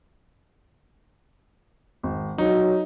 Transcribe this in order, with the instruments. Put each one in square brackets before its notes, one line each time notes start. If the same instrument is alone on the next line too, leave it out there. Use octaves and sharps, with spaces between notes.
[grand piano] G#1
[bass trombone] F#3 [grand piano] D#4